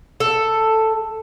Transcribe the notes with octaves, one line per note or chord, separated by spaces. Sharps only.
A4